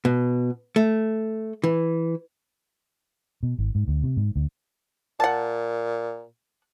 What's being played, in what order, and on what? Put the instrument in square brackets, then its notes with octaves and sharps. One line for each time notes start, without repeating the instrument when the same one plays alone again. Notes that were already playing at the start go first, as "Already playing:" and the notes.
[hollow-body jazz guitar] B2
A3
E3
[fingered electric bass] B2
G#1
G#2
D2
C3
G#2
D2
[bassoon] A#2 [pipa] F#5 A5